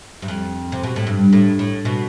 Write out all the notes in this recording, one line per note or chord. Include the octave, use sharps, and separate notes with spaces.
G2
F2
C3
B2
A2
G2
A2
A2
B2